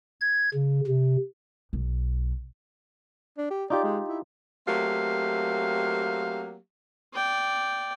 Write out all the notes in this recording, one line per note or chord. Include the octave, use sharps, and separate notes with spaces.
G#6
C#3
C3
B1
D4
G4
D#4 F4 G4 D5
G#3
E4
F#3 A3 A#3 C4 G4 F5
D5 G5